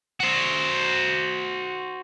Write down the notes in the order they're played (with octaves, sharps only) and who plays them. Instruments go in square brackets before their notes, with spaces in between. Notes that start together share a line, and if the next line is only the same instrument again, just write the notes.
[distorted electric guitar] F#4 C5